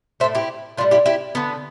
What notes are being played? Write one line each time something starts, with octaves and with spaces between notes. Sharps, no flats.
A2 F3 A3 C5 E5
E4 G4
A2 G3 D4 F4
E4 G4
E4 G4
D3 A3 B3